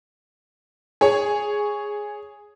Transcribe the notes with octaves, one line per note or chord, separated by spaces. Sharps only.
G#4 C#5